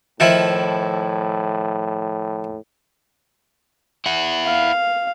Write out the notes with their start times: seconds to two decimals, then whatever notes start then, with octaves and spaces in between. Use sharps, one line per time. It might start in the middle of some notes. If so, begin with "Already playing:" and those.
0.20 A2 D#3 F3 E4
4.06 E4 F#5
4.45 F5